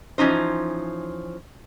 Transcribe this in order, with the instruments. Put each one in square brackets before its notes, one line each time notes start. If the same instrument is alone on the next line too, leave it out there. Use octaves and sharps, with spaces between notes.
[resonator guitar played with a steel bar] E3 F3 C#4 D#4 C5